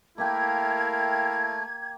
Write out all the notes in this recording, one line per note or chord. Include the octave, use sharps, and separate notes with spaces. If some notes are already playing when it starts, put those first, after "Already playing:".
A3 A#3 E4 G4 A#4 F5 G5 G#6